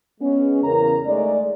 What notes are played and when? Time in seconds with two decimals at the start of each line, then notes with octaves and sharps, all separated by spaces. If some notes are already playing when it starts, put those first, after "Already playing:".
0.21 G#3 B3 C#4
0.64 E2 C#3 A#4 A#5
1.05 G#3 A3 D#4 C#5 D5